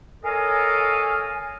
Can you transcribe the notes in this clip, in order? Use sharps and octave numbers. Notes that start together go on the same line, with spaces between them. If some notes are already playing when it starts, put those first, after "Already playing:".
A4 A#4 C#5 D#5 F5 G#5